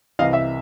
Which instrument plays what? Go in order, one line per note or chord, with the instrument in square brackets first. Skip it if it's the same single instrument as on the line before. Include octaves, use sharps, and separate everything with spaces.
[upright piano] C2 C3 E3 [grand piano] D#5 F5
[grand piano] E5